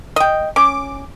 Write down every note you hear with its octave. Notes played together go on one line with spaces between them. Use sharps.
D#5 G5
C#4 D6